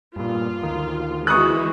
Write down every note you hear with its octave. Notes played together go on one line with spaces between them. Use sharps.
G2 A#2 F4
D2 D#3
E3 G#3 F#4 C#6 D#6 F#6